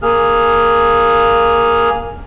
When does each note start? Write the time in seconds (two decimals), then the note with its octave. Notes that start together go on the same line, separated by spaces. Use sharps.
0.02 A#3 G#4 F6